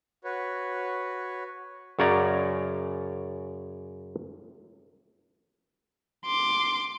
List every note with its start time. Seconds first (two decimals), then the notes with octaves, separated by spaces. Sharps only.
0.24 F#4 B4 C#5
1.99 F#2 C#3 C#5 D5 A#5
6.25 C6 D6